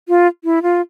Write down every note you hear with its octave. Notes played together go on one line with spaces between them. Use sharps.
F4
E4
F4